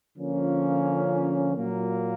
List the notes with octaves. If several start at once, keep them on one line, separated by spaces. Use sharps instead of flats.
D3 F3 A#3 C#4 F4
A#2 F#3 A#3